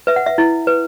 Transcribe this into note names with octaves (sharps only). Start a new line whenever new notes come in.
B4 E5
F#5
E5
E4
B4